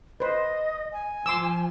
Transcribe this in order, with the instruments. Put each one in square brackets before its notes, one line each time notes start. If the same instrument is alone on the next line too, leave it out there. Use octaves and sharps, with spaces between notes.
[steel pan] B4 C5 [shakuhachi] D#5
[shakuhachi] G#5
[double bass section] F3 [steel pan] C6 D6 E6